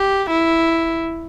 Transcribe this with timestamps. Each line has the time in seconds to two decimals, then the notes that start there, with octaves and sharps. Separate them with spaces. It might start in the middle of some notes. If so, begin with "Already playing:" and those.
Already playing: G4
0.30 E4